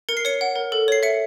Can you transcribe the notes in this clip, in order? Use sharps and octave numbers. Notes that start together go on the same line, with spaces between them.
A#4 C#7
C7
C#5 C#7
F#5
A#4
A4
C#5 C7
E5 C#7